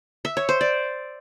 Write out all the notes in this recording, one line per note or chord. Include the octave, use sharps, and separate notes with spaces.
E5
C#5
C5
D5